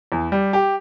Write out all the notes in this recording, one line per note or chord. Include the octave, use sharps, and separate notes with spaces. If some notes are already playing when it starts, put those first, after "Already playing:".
E2
G3
G4